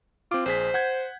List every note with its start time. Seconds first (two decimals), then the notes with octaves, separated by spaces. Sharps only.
0.31 C4 F4 D6
0.46 A#1 G#4 C5 B6
0.74 F#5 G6 G#6